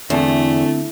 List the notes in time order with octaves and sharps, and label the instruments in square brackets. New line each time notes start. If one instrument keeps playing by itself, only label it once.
[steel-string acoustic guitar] E2 [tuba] D3 [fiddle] A3 [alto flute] C4